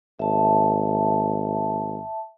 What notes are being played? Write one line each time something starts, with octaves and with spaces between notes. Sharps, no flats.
G#1 E5 A5